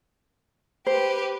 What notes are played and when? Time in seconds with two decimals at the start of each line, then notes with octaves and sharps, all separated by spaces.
0.86 G4 B4 C5